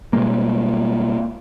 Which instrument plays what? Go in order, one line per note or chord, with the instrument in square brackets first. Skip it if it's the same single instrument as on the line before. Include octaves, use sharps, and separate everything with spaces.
[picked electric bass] B2 G3 G#3 A#3